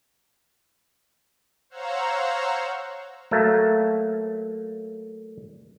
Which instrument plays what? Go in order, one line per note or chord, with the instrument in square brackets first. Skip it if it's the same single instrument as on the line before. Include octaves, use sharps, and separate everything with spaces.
[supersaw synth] C5 C#5 F5 F#5 A#5 E6
[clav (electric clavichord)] F#3 A3 A#3